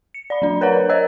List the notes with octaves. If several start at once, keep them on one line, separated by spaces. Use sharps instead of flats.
C#7
D5 B5
F#3 D4
A#4 B4 C#5 D5 F#5 A#5
A#4 C5 C#5 D#5 E6